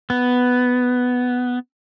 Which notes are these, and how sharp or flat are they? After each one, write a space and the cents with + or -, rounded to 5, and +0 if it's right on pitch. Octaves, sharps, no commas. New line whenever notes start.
B3 +5